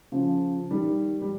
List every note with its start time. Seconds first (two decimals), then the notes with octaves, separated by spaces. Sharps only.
0.12 C#3 F3
0.71 D#3 G3
1.22 G3